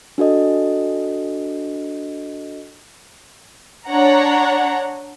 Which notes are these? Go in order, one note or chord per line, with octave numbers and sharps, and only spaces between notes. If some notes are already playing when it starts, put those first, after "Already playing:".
D4 F#4 A4 D#5
D4 C#5 F#5 A#5